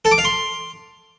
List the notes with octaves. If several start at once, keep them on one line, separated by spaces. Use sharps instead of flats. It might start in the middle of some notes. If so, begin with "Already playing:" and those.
A4
D6
F5
C6